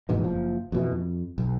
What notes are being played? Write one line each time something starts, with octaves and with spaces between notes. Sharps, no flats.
F1 E2 G#2 B2
F#1 F3
F2 B2 E3
F2
B1